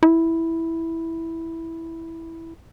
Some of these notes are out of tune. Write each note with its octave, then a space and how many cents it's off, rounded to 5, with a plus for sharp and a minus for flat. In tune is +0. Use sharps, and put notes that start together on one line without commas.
E4 -5